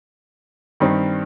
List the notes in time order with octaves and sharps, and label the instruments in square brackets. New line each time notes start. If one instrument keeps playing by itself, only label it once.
[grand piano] G2 D#3 G3 C4 D#4